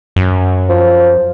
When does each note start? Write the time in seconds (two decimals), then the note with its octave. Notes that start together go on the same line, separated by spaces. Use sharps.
0.16 F#2
0.70 F3